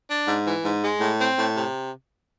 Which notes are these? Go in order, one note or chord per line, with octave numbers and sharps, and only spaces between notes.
D4
G#2
E3
G#2
G#3
A2
C4
A2
C3